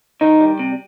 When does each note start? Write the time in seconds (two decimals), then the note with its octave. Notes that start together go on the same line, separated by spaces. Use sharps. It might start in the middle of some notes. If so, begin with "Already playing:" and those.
0.21 D#3 D#4
0.40 G3
0.59 C3